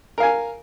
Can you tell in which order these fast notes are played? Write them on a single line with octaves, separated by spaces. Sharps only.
A#4 F5 G#5